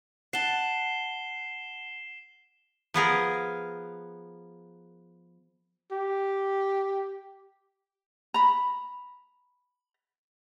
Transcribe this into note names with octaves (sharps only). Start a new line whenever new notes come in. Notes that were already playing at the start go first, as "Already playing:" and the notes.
F#5 A5 C7 E7 G7
F3 B3 G#4 A#4
G4
A#5 B5